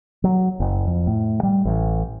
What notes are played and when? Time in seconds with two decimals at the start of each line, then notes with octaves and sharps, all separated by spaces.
0.24 F#3
0.60 F#1
0.87 F2
1.07 A2
1.43 G3
1.65 A1